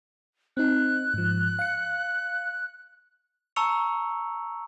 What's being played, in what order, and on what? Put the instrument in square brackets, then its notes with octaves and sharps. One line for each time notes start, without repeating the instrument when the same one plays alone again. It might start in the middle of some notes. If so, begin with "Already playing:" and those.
[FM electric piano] C4 D#4 [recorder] F#6
[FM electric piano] G#2 F3
F5 C#7
[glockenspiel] A5 A#5 C#6 E6 C#7 F7